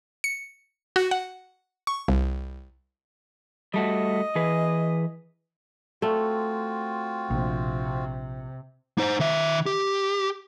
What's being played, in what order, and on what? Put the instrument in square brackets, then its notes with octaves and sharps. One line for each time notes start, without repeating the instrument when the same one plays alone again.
[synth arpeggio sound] C#7
F#4
F#5
C#6
C2
[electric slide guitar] G3 A3 F#4 [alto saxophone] D#5
[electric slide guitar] E3 G#4 B4
[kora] A3 [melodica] C4 F4 F#4
[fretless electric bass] A#1 [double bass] C3
[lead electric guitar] D#4 C5
D#3 E5
G4